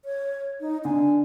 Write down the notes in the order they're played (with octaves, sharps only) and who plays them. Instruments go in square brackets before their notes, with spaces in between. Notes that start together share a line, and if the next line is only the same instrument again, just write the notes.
[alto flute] C#5
D#4
[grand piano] D3 [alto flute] G#5